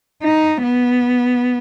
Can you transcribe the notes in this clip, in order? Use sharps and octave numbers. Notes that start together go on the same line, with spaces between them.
D#4
B3